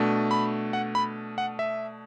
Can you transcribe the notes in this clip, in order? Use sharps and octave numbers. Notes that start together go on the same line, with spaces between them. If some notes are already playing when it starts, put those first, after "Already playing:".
Already playing: B2 A3 D4
B5
F#5
B5
F#5
E5